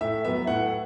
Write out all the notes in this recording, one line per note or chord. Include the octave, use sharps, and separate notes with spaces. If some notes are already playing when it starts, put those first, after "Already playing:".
A2 E5
F#3 B3 E5
A2 F#5